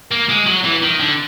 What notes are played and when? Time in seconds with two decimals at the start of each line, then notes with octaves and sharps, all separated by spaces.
0.11 A#3
0.29 G#3
0.47 F#3
0.64 E3
0.83 D#3
1.00 D3